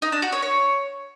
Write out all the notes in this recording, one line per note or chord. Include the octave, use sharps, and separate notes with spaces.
D#4
D4
F#4
C#5
C#5